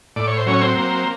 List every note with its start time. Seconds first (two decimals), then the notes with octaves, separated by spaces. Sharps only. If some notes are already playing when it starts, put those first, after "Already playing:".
0.16 A2 D5
0.27 C#5
0.37 C5
0.46 F#3 C#4 C#5
0.61 C4 C5
0.76 A#3